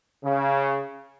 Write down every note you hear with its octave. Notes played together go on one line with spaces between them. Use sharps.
C#3